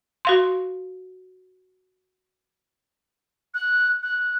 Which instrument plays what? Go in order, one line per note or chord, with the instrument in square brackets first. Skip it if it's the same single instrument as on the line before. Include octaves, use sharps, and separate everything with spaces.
[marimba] F#4 F5 C6
[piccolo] F#6
F#6